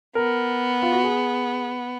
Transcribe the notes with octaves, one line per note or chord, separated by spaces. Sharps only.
B3 A#4
F4
F#4
G#4